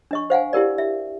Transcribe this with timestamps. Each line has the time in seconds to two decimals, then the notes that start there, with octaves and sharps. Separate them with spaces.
0.11 D4 D#5 C#6
0.30 C5 F5 F#5 G#5
0.53 E4 G4 A#4 D5
0.78 E5